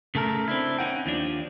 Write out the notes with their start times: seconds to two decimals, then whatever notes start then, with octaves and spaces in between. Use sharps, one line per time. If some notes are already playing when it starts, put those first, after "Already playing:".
0.15 C#3 A3 A4 A#4
0.48 C4 D4 E4
0.79 C#4 D#4 F#5 G5
1.06 D#2 F3 D4